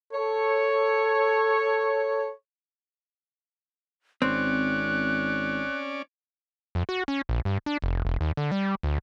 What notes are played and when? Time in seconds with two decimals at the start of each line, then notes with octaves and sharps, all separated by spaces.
0.13 A4 C#5
4.22 G#1 C4 C#4 D5 F#6
6.75 F2
6.89 F#4
7.08 C#4
7.29 A#1
7.45 G2
7.66 D4
7.82 F1
8.05 E1
8.21 D#2
8.37 D3
8.52 G3
8.83 D2